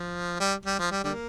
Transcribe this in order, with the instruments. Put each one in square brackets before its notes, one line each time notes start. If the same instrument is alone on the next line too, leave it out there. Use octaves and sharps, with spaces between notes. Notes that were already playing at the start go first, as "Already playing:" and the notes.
Already playing: [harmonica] F3
G3
G3
F3
G3
D3 G3 A#3